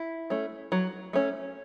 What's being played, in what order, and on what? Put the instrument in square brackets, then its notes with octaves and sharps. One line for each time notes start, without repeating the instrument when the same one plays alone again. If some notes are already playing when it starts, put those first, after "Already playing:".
Already playing: [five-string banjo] E4
A3 C#4
F#3
A3 C#4